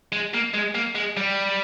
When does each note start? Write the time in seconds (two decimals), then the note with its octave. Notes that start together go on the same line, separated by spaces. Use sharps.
0.12 G#3
0.34 A#3
0.54 G#3
0.75 A#3
0.95 G#3
1.17 G3